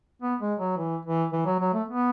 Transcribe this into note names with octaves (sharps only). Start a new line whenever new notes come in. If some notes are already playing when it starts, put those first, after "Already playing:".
B3
G#3
F#3
E3
E3
E3
F#3
F#3
A3
B3